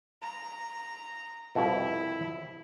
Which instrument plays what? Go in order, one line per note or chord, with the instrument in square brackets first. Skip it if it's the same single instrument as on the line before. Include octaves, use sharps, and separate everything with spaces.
[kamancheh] A#5
[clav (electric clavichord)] C2 F2 B2 [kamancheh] E4